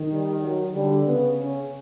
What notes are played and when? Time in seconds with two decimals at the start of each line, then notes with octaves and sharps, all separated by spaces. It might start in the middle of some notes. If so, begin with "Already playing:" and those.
Already playing: D#3
0.11 G3
0.42 F#3
0.74 D3 G3
1.06 C#3 B3
1.39 C#4